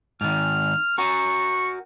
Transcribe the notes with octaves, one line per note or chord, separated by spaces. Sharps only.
G#2 D#3 F6
F#4 A#4 C#6